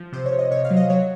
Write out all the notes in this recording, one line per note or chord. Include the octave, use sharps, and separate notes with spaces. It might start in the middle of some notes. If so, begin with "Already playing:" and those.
Already playing: F3
C3 C5
C#5
C3
D#5
C3 C#5
F5
F#3
D#5
F#3 C#5